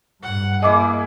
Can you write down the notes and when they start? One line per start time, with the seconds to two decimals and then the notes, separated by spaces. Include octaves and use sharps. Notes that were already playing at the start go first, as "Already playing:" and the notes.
0.23 G2 F#5
0.62 A#3 E4 G#4 D#5 D6